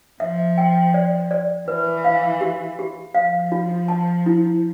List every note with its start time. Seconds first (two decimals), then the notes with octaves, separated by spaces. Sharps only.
0.20 F3 E5
0.58 G5
0.94 D5
1.31 D5
1.68 E3 B4
2.04 F5
2.41 G4
2.79 G4
3.15 F3 F5
3.52 F4
3.88 A5
4.26 E4